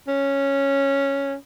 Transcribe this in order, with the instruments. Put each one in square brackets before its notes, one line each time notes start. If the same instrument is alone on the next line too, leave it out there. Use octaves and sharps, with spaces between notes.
[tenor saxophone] C#4